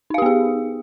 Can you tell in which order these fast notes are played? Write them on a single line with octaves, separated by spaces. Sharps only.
D#4 F5 G4 B3 G#4